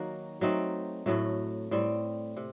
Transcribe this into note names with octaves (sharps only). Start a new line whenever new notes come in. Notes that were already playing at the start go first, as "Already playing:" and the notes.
Already playing: D#3 F#3 A#3 F#4
F#3 A3 C4 D#4
A2 F#3 A3
A2 G3 C4
C3